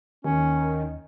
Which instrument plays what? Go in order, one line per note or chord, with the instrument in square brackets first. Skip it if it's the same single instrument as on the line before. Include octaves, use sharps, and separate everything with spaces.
[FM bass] D#2 [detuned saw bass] D#3 [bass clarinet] C#4